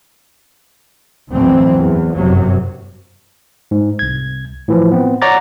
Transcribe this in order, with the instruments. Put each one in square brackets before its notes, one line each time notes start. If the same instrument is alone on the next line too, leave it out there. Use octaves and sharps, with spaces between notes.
[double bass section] D2 A2 E3 F#3 C4
E2
G1 F#2 C3 F#3
[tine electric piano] G#2
C2 G#6
A2 E3 F3
B3 C4
C#5 D5 F#5 A#5 D6 A6